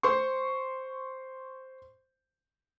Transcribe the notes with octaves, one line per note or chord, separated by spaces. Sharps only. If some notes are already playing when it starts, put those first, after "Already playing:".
C5 C6 C#6